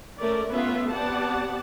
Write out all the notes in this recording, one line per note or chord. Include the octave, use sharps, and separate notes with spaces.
A3 C#4 A#4 D5
A3 B3 C#4 F4 B4 E5
B3 C4 G4 D5 F#5 A5